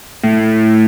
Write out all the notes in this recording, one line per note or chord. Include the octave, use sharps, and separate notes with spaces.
A2